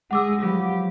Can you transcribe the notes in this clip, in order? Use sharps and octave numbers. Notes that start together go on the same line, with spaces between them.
G#3 G#4 F#5 D6 E6
F3 F#3 B3 G4